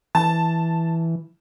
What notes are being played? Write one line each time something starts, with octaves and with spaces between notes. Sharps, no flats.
E3 A5